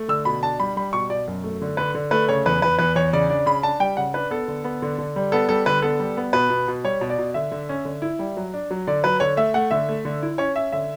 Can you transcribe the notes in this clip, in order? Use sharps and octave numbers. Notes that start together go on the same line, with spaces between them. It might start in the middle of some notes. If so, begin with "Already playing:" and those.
Already playing: A3
D3 E6
B2 B5
D4 A5
G3 B5
G3 B5
B2 C#6
B2 D5
F#2
A3
D3
D3 B4
D3
A3 B4
C#3 C#5
E2 B4
E2 B4
E2 B4
E2 C#5
C#3 D5
D4 D5
C#3 B5
D4 A5
G3 G5
C#3 F#5
D4 B4
B3 A4
D3
B3
D3
D3
G3
B3 A4
G3 A4
D3 B4
B3 A4
G3
B3
B2 B4
B2
B2
G3 C#5
B2
D5
B2
D3 E5
D3
C#4
D3
E4
G3
F#3
D4
F#3
D3 D5
F#3 B4
D3 C#5
A3 E5
A3 F#5
D3 E5
A3
D3
E4
C#4 C#5
C#4 E5
D3 E5